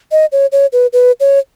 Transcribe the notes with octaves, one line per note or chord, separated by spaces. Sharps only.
D#5
C#5
C#5
B4
B4
C#5